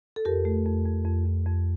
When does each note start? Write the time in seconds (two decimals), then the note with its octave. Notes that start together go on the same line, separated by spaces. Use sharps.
0.16 A4
0.25 F2 G4 A#4
0.45 A3
0.66 F2
0.86 F2
1.05 F2
1.26 F2
1.46 F2